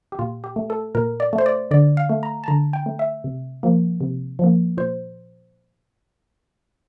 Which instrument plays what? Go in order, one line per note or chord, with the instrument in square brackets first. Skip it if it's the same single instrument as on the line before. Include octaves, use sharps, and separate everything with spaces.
[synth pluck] G4
A#2 F4
G4
A3
A4
A#2 A#4
D5
A3
C5
D5
D3 D5
F5
A3
A#5
A5
D3 A#5
G5
A3
E5
C3
F3 A#3
C3
F3 A#3
A#2 C5